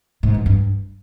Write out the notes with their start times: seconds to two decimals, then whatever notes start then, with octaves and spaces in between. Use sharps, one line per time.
0.23 G#2
0.34 E3
0.46 G2